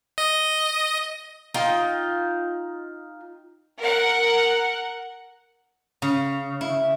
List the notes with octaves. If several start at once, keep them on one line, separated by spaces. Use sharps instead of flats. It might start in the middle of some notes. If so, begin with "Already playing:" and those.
D#5
D#4 F4 G5
A#4 F#5
C#3
E4